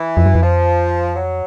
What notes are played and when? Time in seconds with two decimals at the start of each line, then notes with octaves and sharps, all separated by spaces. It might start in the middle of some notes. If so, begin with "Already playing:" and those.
Already playing: E3
0.17 F2
0.26 F#2
0.35 F2
0.42 F3
1.15 F#3